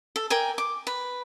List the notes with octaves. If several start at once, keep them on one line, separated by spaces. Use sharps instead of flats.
A4
A#4 D5 G5 G#5
D6
B4